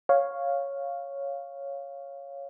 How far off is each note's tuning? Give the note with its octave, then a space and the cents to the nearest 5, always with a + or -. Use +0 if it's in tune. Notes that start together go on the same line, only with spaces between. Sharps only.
C#5 +0 F5 +0